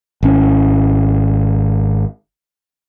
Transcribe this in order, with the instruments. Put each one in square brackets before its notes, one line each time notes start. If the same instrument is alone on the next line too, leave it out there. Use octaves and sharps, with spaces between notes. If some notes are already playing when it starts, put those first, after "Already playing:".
[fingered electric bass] G#1 C#4